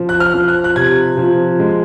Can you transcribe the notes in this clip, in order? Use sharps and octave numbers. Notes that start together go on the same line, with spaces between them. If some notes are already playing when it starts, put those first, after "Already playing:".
Already playing: F3
F#6
F6
F3
F#6
F#6
C3 G#6
F3
G#3